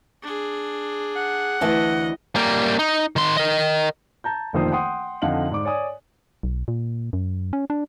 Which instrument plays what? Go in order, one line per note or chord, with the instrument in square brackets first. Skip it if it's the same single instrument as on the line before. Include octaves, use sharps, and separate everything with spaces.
[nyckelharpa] D4 G#4
[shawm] F#5
[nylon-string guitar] D2 E3 A5 [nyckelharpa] D#5
[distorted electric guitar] G3 A#3
D#4
D#3 C6
A#4 D#5
[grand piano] A5 A#5 G6
F1 A#1 D#3 F3 C5 D#6
F#5 G5 C6 D#6
F2 D3 D#4 F5 F#5 F#7
G#2 D5 D6
C#5 D5 G#5 D#6
[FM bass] B1
A#2
F#2
C#4
D4